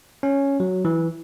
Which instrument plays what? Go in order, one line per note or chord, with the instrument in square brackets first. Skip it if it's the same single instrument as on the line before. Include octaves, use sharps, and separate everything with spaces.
[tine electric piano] C#4
F#3
E3